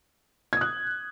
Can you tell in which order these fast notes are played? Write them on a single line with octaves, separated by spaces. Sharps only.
G#6 D#6 F#6